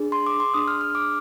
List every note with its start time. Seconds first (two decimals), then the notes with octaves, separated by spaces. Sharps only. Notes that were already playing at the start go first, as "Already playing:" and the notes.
Already playing: D4 G#4
0.12 C6
0.26 D6
0.40 C6
0.54 D4 G#4 D#6
0.68 F6
0.81 F6
0.95 D6